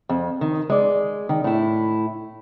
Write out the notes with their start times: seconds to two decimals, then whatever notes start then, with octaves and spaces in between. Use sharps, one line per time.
0.09 F2
0.41 D#3
0.70 G#3 D5
1.29 D#3
1.44 A2 E4